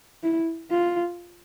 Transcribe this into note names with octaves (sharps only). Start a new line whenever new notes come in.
E4
F4